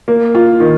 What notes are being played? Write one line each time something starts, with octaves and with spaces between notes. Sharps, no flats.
A#3
F4
D#3